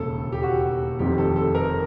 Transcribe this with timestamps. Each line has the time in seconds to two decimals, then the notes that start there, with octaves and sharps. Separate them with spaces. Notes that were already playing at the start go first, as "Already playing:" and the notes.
Already playing: E1 D#2 C#3 A4
0.32 G4
0.43 F#4
0.99 F1 F2 C3 D#3 G4
1.18 A4
1.36 A4
1.55 A#4